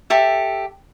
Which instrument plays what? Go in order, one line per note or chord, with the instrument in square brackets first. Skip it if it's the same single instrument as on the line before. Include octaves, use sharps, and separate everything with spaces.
[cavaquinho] G4 A4 E5